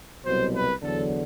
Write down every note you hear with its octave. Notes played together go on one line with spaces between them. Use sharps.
C2 B2 F#3 C5
B4
E2 D3 F#3 A4